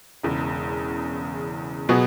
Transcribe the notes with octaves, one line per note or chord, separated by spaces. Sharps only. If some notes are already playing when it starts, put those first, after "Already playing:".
E1 E2 C#3
B2 F#3 B3 G#4